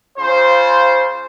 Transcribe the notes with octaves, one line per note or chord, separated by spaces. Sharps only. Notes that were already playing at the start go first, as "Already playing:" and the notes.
C#3 F4 C5